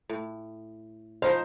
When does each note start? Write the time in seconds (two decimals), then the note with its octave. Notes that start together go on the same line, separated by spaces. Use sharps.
0.09 A2
1.22 F3 D#4 C5 F5